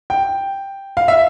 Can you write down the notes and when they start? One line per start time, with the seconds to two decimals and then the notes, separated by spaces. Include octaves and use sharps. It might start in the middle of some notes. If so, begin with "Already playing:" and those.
0.10 G5
0.97 F5
1.08 E5